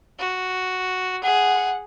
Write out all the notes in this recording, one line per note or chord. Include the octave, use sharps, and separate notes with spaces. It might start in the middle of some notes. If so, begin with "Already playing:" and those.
F#4
G#4 F#5